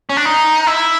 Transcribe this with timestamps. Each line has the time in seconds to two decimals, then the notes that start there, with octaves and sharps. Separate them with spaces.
0.10 C#4
0.17 D4
0.25 D#4
0.67 E4